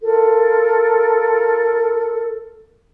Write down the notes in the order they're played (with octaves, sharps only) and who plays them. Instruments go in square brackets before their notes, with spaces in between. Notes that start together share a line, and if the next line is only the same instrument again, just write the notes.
[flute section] F4 A4 A#4